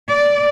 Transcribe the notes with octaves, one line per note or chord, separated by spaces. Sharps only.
D5